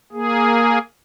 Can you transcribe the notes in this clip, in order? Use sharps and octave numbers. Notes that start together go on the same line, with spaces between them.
A#3 G#4